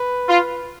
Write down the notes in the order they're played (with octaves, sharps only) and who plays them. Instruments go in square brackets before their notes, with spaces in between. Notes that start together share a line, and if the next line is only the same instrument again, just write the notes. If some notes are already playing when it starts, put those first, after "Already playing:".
Already playing: [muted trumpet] B4
[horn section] F4